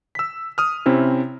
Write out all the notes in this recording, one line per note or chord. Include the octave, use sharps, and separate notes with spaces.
E6 B6
D#6 F6
C3 C4 C#4 E4